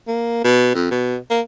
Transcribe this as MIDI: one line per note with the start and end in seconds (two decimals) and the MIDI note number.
0.08 0.41 58
0.44 0.72 47
0.75 0.86 41
0.91 1.17 47
1.30 1.41 58